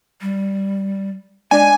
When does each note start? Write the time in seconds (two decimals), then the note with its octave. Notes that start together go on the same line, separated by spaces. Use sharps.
0.21 G3
1.51 G#3 D4 D5 G#5